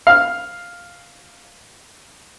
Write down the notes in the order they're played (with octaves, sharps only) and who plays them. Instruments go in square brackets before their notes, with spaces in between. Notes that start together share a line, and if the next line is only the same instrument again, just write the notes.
[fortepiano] F5 F6